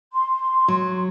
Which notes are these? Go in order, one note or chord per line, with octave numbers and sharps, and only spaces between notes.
C6
F#3